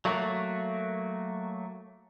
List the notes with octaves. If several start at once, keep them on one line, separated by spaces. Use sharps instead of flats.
F#3 A3 A#3 F#4